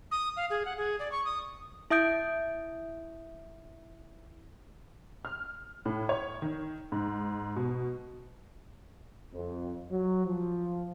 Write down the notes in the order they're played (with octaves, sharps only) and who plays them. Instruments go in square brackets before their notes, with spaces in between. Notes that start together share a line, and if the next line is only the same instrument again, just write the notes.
[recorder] D#6
F5
G#4
F#5
G#4
D5
C#6
D#6
[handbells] E4 E5 D#6 G6 D7
[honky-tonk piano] F6
A2
C#5
D#3
G#2
B2
[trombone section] F2
F#3
F3